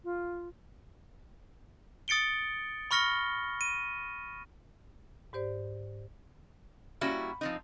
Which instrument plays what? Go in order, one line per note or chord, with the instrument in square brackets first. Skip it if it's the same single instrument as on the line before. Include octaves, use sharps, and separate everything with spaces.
[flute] F4
[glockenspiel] D#6 A6 C#7 D7 G7
B5 C#6 F6 A#6 C#7 G7
D#7
[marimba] G#2 G4 C5 D5
[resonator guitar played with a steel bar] G3 A#3 C#4 E4 F#4 E5
F3 C4 D#4